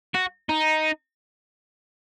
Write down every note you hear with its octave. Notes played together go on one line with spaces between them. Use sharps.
F#4
D#4